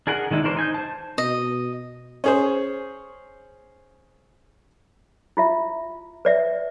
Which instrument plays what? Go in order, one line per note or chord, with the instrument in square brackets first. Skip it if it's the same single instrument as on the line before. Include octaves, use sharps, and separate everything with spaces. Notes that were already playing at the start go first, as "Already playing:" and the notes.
[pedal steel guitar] D4 G#4 A#4 F#5
D#3 G#3 D4 E4
E3 D4 A#4 C5
D#4 G#5 G6
C5 A5
[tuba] B2 [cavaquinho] D#5
[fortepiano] C#4 G#4 C5
[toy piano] E4 F4 E5
B4 D5 E5